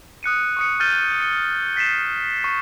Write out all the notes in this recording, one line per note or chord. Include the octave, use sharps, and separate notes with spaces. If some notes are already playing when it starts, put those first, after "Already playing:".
D#6 F#6 C#7 D#7
C#6 D#6 C#7
F6 G6 A6 D#7 G7
C#7 G7
A6 B6 C7 D#7 E7
C#6